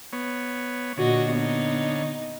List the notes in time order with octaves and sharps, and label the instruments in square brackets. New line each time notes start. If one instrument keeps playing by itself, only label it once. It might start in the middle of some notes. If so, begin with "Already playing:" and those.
[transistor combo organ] B3 C#5
[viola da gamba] A#2 F#4 D#5 [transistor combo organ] D3 C#5
[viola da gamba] B3 D#4